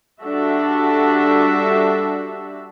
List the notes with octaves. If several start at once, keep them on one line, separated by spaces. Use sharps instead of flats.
G3 D4 F#4 A4 E5